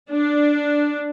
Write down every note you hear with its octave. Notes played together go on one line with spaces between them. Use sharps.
D4